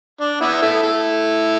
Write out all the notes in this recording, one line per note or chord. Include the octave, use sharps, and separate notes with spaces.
D4
B3 E4
E4 A4
E4 A4